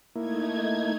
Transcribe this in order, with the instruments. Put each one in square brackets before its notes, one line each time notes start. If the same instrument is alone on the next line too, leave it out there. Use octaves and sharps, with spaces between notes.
[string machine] A3 D#4 G#6 [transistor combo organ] A#3 E4